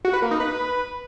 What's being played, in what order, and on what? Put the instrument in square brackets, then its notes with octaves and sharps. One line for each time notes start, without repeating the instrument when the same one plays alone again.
[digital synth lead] F#4
B4
A#3
D#4
B4